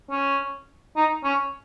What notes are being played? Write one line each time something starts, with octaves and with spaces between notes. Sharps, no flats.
C#4
D#4
C#4